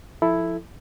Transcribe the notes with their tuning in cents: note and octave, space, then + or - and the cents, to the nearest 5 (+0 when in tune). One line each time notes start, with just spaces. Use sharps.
F3 +0 E4 +0 A4 +0